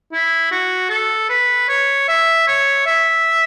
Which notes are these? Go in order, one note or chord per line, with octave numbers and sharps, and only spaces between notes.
E4
F#4
A4
B4
C#5
E5
C#5
E5